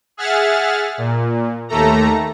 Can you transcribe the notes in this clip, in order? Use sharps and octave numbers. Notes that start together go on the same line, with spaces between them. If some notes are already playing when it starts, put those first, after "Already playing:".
G#4 E5 F#5 F6 A6
A#2
D#2 A3 A4 A#5